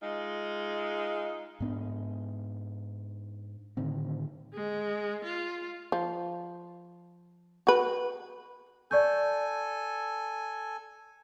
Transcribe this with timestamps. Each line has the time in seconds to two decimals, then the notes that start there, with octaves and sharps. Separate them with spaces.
0.02 G#3 D#4 F4
1.60 G#2 B3 D4
3.77 A2 D3 D#3 C4
4.54 G#3
5.24 F4
5.92 F3
7.67 F#4 B4
8.91 A4 D5 G#5 C#6 G6